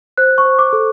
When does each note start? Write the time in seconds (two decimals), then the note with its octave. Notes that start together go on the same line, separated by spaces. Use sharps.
0.17 C5 F#6
0.38 C#6
0.45 C5
0.59 D6
0.73 A4